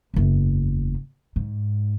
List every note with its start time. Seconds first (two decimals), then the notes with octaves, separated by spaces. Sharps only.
0.14 F#1 E2
1.36 G#2